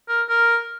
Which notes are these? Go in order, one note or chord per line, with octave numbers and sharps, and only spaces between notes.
A#4
A#4